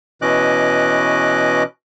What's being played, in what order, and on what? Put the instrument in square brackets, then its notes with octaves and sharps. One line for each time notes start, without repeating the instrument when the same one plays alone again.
[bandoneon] B2 E3 C#4 D#5 D6 F#6